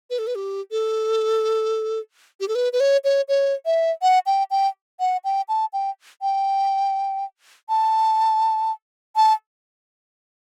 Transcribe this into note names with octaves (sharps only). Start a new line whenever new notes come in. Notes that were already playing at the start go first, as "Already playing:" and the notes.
B4
A4
B4
G4
A4
G4
A4
B4
B4
C#5
C#5
C#5
E5
F#5
G5
G5
F#5
G5
A5
G5
G5
A5
A5